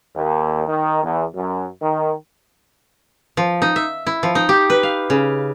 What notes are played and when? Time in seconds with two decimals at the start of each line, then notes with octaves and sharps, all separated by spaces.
0.16 D#2
0.68 D#3
1.03 E2
1.35 F#2
1.81 D#3
3.37 F3
3.62 D#4
3.76 E5
4.07 E4
4.23 F3
4.35 D#4
4.49 G4
4.70 B4
4.83 F5
5.10 C#3